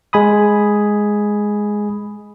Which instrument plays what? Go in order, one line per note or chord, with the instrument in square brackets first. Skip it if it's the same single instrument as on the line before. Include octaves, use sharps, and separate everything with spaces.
[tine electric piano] G#3 G#5 B5 D#6